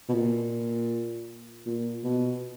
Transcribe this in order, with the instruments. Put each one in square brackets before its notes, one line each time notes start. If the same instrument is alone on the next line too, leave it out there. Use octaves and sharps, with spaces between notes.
[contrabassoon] B2
A#2
A#2
B2